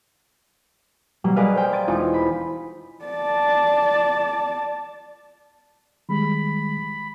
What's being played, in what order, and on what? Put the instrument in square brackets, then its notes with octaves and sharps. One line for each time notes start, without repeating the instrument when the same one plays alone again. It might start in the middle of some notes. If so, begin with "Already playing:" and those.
[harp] B2 F#3 G3 A#3
G#4 A#4 B4 D5 D#5 F5
C5 G5
C6 G#6 A6 D7 D#7
E1 E3 D#4 F4 A6
B5
[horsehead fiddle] D5 A5
[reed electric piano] D#3 G3 G#3 [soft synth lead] B5